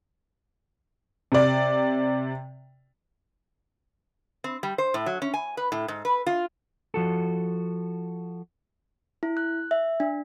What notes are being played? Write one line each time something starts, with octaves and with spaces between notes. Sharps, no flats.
C3 D5
C4
G3
C5
A2
F#3
C#4
G#5
B4
A2
G#2
B4
F4
F3 F#4 A4
E4
F#6
E5
D4